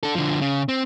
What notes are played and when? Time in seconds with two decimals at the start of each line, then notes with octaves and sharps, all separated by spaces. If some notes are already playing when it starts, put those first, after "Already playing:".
0.03 D4 A4
0.15 D3 F3
0.41 C#3
0.69 C4